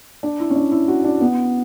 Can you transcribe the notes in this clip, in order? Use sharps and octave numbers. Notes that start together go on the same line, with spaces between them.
D4
E4
C#4
D4
E4
F#4
D4
B3